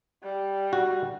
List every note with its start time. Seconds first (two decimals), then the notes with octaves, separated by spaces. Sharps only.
0.23 G3
0.73 F#4